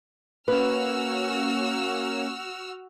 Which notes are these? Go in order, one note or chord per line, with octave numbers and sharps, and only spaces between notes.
A#3 C#4 F#4 B4 E6 F6